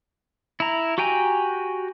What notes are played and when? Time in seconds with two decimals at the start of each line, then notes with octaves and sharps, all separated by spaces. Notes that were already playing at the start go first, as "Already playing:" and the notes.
0.60 E4 A#5
0.98 F#4 G4 G5 G#5 A#5